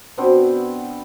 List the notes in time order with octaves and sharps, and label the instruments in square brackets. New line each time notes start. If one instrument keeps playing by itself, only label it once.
[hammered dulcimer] B2 B3 C4 D4